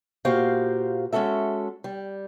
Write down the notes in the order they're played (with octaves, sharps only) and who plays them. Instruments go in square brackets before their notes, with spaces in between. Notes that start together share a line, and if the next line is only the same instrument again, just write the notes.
[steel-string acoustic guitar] A#2 F#4 G4 C5 F5
G#3 C#4 F#4 A4 E5
G3